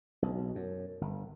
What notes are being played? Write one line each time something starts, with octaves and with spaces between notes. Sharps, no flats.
B1
F#2
G1